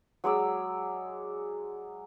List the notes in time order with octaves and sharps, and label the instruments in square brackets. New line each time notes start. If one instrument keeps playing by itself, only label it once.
[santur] F#3 G#3 D5 E6